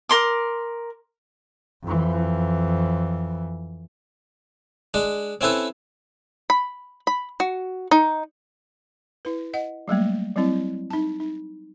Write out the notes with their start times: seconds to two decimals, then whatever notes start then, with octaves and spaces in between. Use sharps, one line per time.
0.09 A#4 C6 D6
1.84 F2 E3
4.94 G#3 D4
5.41 C4 C#4 E4 A4 B4
6.50 B5
7.07 B5
7.40 F#4
7.91 D#4
9.25 E4 B4
9.54 D#5 F#5
9.88 F#3 G3 A3 A#3
10.36 F#3 G3 C4 E4
10.90 D#4 A5
11.20 D#4